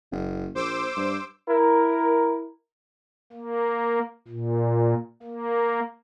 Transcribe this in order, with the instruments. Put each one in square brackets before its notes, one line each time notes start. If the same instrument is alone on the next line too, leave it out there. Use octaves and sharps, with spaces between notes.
[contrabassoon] F#1
[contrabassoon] A#1 [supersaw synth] C5 D6 E6
[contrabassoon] G2
[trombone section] E4 A#4
[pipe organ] A#3
A#2
A#3